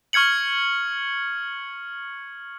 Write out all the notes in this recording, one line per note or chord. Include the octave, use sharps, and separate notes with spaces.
C#6 F6 G#6 C#7 F#7